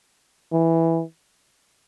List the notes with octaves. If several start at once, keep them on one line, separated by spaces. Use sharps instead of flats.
E3